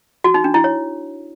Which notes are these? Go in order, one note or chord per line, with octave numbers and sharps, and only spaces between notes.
F#4
D#4
D4
E4
C#5